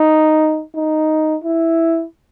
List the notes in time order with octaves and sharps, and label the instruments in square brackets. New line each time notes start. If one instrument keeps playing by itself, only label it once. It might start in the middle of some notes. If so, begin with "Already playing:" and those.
Already playing: [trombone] D#4
D#4
E4